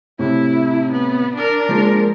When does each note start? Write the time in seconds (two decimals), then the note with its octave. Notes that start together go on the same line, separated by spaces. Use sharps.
0.19 A2 C3 E4
0.92 B3
1.35 D4 A#4
1.69 F3 G#3 A#3